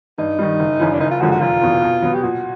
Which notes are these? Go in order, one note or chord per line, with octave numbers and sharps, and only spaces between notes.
G2 D#4
D#3 G3
F#1
F#2 C#3 E3
D4
F#1 D#4
F4
F#2 D3 F3 G#3 F#4
F#4
F1 F4
E2 B2
B2
F#3 B3
G4
A#2 F#4